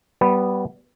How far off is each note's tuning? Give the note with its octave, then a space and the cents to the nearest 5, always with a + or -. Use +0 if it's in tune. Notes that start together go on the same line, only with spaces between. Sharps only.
G3 -20 B3 +0 B4 +0